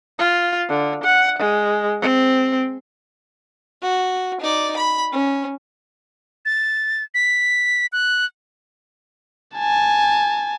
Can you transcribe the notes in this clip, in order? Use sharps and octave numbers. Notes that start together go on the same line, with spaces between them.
F4
D3
F#5
G#3
C4
F#4
D#4 D5
B5
C#4
A6
B6
F#6
G#5 A5